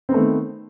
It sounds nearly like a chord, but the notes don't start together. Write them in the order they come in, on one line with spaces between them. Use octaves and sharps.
C4 B3 A3 D#3